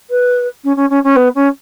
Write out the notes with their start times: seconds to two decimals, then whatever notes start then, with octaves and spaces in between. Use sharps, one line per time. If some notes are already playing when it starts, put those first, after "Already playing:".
0.10 B4
0.64 C#4
0.76 C#4
0.90 C#4
1.04 C#4
1.16 B3
1.35 C#4